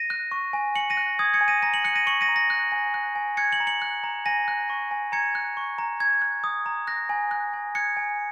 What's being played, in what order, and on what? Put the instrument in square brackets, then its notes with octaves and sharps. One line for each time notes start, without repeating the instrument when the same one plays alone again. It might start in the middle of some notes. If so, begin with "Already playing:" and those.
Already playing: [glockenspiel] A#6 D#7
F#6
C#6
G#5
G#5 C#7 F#7
A#6 D#7
F#6
D#6 G#6
G#6 C#7
G#5
A#6 D#7
A#5 A#6 D#7
C#7 F#7
F#6 C#7 F#7
A#6 D#7
C#6 C#7 F#7
A#6 D#7
A#5
A#6
F#6
G#5
F#6
G#5
F#6 G#6 C#7
C#7 F#7
A#5
C#7 F#7
F#6
A#5
G#5 A#6 D#7
F#6
C#6
G#5
A#5 G#6 C#7
F#6
C#6
A#5
A#5 G#6
F#6
D#6
A#5
F#6 A#6
G#5
F#6
G#5
F#6 G#6 C#7
G#5